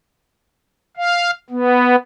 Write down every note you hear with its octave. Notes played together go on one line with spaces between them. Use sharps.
F5
B3